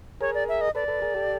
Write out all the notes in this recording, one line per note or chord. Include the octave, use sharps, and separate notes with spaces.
G#4 A#4 C#5
D5
E5
D#5
A4 B4 D5
A4 B4
G#4 A#4
G4 A4